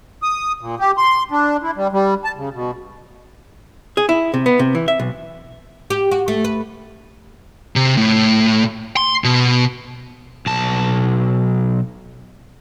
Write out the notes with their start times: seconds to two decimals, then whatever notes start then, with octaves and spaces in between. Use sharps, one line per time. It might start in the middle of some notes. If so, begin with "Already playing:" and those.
0.22 D#6
0.60 A#2
0.79 G4
0.98 C6
1.31 D4
1.63 E4
1.76 G3
1.92 G3
2.24 A5
2.37 C#3
2.54 B2
3.97 G#4
4.09 E4
4.34 C3
4.46 B3
4.59 C3
4.75 E3
4.88 E5
4.99 B1
5.90 G4
6.11 F#4
6.28 A3
6.44 B4
7.76 C3
7.97 A2
8.97 C6
9.24 B2
10.46 B1 A5